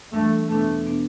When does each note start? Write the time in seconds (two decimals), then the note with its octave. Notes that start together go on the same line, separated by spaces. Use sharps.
0.13 E3 G3 A3 D4
0.49 E2 B2 A3 B3 D4
0.86 B2 B3 D4